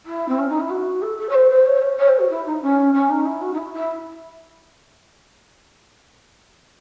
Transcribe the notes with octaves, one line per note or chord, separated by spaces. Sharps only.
E4
C4
C#4
D#4
E4
F#4
A4
A4
C#5
C5
C5
C#5
C5
C#5
C#5
C5
F#4
E4
D#4
C#4
C#4
D#4
E4
F#4
D#4
E4
E4